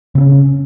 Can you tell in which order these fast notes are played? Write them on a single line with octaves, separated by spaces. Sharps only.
C#3 C4 C#4